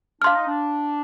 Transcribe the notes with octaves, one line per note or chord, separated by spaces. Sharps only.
D4 F5 C6 F6
D#4
D4